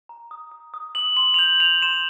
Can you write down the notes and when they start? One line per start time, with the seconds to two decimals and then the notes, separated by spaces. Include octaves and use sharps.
0.09 A#5
0.31 D#6
0.51 D#6
0.74 D#6
0.95 D#6 F#7
1.17 C6 F#7
1.34 F7
1.38 G6 F#7
1.60 G6 F7
1.82 C6 E7